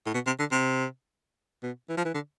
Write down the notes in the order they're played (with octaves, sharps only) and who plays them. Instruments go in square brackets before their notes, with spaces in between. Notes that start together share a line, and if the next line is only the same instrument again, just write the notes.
[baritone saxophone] A2
B2
C3
D3
C3
B2
E3
F3
E3
D3